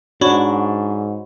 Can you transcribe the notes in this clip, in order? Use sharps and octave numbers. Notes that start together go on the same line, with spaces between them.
G#2 D4 F#4 C#5 B5 C#6